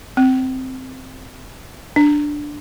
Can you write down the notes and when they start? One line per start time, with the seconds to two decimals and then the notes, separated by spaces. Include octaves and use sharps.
0.17 C4
1.96 D4